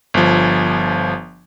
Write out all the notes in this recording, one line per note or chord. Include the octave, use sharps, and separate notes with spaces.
G1 F3